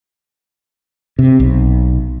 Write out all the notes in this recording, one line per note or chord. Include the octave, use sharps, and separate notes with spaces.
C3
B1